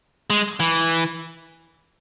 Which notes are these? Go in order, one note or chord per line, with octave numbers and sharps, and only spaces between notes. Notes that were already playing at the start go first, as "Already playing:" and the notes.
G#3
E3